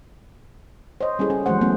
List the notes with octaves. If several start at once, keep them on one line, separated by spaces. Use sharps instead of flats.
C5 C#5 D#5
G3 C#4 E4 G#4 A4
C#4
E3 F#3 G#3 A3 C5 F#5
F#3 A3 B3 C#4